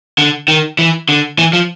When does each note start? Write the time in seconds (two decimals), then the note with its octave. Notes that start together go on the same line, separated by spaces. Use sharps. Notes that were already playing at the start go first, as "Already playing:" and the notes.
0.18 D3
0.48 D#3
0.79 E3
1.09 D3
1.39 E3
1.53 F3